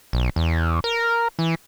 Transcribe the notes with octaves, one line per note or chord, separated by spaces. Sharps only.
B1
E2
A#4
E3